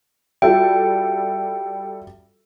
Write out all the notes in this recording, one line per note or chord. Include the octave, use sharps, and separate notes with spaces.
G3 F4 F#4 A4 E5 G5